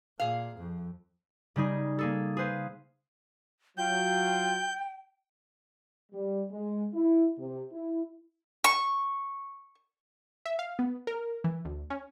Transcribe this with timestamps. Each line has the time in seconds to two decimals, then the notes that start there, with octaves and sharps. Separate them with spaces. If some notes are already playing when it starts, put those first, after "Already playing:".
0.20 A#2 G#4 F5
0.57 F2
1.56 C#3 G3 D#4 G#4
1.99 A#3 G#4 A4
2.37 G#4 B4 C5 F5
3.78 F#3 F4 G5 G6
6.12 G3
6.51 G#3
6.93 E4
7.38 C3
7.71 E4
8.64 C#6
10.46 E5
10.59 F5
10.79 B3
11.07 A#4
11.44 E3
11.65 D2
11.90 C#4